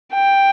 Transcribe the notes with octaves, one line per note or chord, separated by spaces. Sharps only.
G5